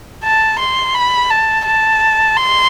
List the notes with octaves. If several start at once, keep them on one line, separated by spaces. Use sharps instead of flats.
A5
C6
B5
A5
A5
C6